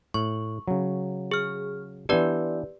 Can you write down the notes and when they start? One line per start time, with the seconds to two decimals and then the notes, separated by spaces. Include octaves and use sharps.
0.14 A2 C#6
0.68 C#3 F#3
1.31 G#4 F6
2.09 E3 B3 D4 G4 B4 D5